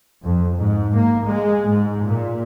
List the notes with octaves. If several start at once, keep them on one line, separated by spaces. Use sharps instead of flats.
F2
G#2
A#3
G#3
G#2
A#2